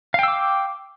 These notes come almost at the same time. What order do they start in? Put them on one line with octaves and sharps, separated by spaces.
F5 G5 E6 D6